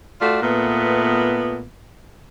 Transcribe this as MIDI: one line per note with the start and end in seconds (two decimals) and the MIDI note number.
0.21 0.39 57
0.21 0.39 65
0.21 0.39 66
0.21 0.39 74
0.42 1.63 46
0.42 1.63 57
0.42 1.63 59